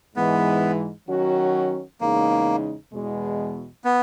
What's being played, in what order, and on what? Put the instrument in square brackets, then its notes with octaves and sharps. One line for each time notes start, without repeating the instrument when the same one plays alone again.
[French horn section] G#2 E3 G#3 [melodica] B3
[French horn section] D#3 F#3 C#4 F#4
[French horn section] E2 C#3 G#3 D#4 [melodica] A#3
[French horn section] E2 B2 G#3
[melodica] B3